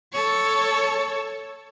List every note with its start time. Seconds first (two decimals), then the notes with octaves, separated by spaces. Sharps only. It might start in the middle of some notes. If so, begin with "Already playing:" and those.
0.13 A4 C#5